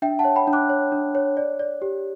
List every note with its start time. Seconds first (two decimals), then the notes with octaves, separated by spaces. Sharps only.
0.02 D4 E5 G5
0.19 F#5 A5
0.24 C#5
0.36 G5 B5
0.47 D4
0.53 D6 F#6
0.69 C#5
0.92 D4
1.15 C#5
1.37 D5
1.59 D5
1.82 G4